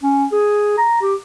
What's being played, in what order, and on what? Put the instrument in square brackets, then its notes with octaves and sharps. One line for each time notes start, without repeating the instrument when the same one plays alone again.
[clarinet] C#4
G#4
A#5
G4